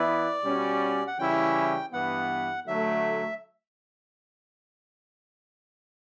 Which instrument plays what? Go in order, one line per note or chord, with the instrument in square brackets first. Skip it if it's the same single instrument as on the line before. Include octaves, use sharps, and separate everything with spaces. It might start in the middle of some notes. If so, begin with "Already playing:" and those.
Already playing: [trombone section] E3 B3 E4 B4 [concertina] D5
[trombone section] B2 G3 C#4 F#4
[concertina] F#5
[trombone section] C#3 E3 G3 C#4 E4 [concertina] G5
[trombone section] G2 E3 B3 [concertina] F#5
[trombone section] D3 F#3 A3 [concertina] E5